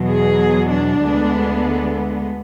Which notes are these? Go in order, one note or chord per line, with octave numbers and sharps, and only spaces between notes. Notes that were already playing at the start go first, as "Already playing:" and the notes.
Already playing: E2 B2 F#3
G#4
D4
D2 D3 G#3 B3